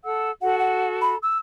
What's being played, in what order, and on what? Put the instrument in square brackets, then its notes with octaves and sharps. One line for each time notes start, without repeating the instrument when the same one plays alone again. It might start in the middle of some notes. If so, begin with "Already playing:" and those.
[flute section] A4 F#5 E6
[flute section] F#4 A4 [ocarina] F#5
[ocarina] F#5
B5
E6